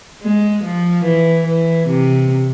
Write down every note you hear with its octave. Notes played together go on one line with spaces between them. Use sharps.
G#3
F3
E3
E3
C3